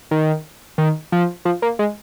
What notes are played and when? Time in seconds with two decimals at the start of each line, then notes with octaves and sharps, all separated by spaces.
0.11 D#3
0.78 D#3
1.12 F3
1.45 F3
1.62 A#3
1.79 G#3